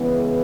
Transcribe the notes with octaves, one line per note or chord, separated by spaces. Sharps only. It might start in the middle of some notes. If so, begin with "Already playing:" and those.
Already playing: C#3 E3 G#3 B3